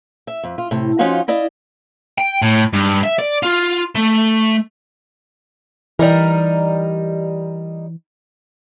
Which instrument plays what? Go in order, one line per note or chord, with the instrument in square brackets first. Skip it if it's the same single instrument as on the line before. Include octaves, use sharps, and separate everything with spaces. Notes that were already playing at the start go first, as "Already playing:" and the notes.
[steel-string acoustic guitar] E5
F2
F4
A2 C3
F3 C#4 D#4 F4 F#4 F5
E4 D5 D#5 F5
[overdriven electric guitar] G5
A2
G2
E5
D5
F4
A3
[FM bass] E3 [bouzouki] G3 D#4 A#4